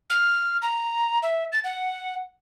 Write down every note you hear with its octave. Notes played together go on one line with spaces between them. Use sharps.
F6
A#5
E5
A6
F#5